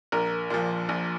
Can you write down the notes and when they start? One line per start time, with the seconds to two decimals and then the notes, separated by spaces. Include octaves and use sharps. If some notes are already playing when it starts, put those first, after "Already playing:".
0.12 A#1 A#4
0.50 A#2 F3
0.89 A#1